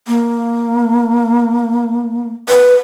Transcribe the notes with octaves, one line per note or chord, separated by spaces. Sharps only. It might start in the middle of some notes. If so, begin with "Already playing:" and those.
A#3
B4